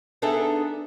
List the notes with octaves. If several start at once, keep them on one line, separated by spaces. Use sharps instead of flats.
B3 D4 D#4 G#4 A4 E5